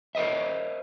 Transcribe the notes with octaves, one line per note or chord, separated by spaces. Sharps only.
A#4 C5 D#5 E5